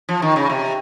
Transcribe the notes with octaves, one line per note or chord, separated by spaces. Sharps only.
F3
D#3
C#3
C3